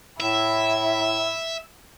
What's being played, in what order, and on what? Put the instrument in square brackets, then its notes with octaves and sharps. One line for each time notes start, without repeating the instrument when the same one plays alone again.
[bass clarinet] A2 [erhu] E4 [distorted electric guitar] E5